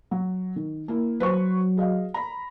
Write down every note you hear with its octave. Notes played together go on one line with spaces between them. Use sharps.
F#3
D#3
A#3 E4
F#3 B4 C5 C#6
G#4 D#5 F5
A#5 B5